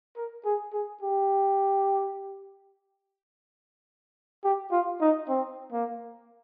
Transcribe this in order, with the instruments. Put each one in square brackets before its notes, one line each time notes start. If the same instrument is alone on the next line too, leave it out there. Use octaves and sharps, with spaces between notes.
[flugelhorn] A#4
G#4
G#4
G4
G4
F4
D#4
C4
A#3